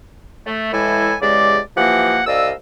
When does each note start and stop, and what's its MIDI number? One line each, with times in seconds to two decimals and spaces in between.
0.46 0.69 57
0.72 1.14 45
0.72 1.14 52
0.72 1.14 56
0.72 1.14 64
0.72 1.14 69
0.72 1.14 80
1.21 1.59 40
1.21 1.59 49
1.21 1.59 56
1.21 1.59 67
1.21 1.59 74
1.77 2.22 52
1.77 2.22 53
1.77 2.22 58
1.77 2.22 67
1.77 2.22 78
2.27 2.51 36
2.27 2.51 74
2.27 2.51 75
2.27 2.51 77
2.27 2.51 88